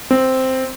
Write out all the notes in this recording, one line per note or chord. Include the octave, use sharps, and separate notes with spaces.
C4